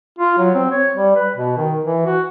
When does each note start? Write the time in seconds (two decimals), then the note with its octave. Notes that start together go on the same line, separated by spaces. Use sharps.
0.19 F4
0.38 F#3
0.55 C4
0.72 C#5
0.95 G3
1.16 B4
1.36 B2
1.57 D#3
1.84 E3
2.06 F#4